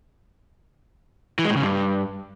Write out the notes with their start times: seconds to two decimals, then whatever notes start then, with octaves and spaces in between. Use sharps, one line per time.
1.39 E3
1.45 G#3
1.50 A2
1.56 C#3
1.62 G2